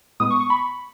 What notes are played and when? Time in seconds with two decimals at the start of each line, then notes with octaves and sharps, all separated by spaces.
0.20 A2 G#3 B3 D#6
0.31 C#6
0.41 C#6
0.50 B5